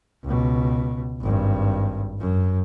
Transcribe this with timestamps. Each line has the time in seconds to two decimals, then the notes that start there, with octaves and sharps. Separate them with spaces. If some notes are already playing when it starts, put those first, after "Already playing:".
0.24 C#2 B2
1.21 G#1 G2
2.19 F#2